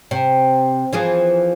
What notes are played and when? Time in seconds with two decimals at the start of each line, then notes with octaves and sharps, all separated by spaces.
0.11 C3
0.93 E3 F3 G#4